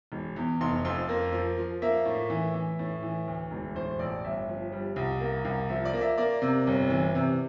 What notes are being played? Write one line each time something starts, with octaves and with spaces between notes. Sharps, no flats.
E1
E2
F1 C6
F2 C6
A#3
F3
F3
A#3 E5
A2
E3
E3
A2
E3
D2
E1
A2 C5
A1 D5
G1 E5
F3
G3
C2
A#3
C2
F3 E5
D5
A#3
E5
A#3 D5
C3
G1
E3
C3